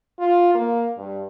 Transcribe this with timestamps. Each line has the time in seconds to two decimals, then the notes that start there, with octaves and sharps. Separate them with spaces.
0.19 F4
0.55 A#3
0.98 G2